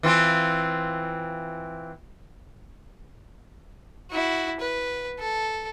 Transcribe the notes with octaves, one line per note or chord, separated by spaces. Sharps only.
E3 C4 F4
E4 F#4
B4
A4